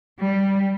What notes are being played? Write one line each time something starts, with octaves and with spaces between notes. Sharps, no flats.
G3